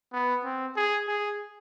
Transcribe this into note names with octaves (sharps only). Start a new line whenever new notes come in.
B3
C4
G#4
G#4